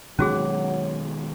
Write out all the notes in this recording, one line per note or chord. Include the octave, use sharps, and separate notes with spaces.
B2 D#3 F#3 G#3 C#4 F#4 G#4